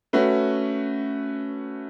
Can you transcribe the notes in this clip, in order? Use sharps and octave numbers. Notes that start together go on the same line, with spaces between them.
A3 C#4 F#4 B4